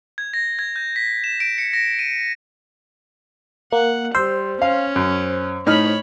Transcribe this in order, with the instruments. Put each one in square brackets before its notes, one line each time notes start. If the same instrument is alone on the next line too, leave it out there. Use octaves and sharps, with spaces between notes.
[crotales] G#6
A#6
G#6
G6
B6
E7
D7
C#7
A#6
D#7
[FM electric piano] A#3 [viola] F#5
[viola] G3 [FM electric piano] C5 [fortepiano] E6
[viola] C#4 [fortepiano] F5
[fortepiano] F#2
[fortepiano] A2 D#4 F6 [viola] C#5 B5